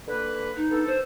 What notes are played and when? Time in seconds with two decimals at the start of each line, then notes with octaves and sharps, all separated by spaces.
0.08 D3 A#3 B4
0.56 D#4
0.71 B3 D4 A4
0.87 C5